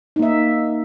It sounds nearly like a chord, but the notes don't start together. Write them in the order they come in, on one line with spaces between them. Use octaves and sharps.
D#4 A#3 E5